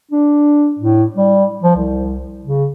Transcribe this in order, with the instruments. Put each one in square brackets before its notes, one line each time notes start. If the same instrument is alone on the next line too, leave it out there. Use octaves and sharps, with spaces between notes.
[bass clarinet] D4
A2
G3
F3
C2
C#3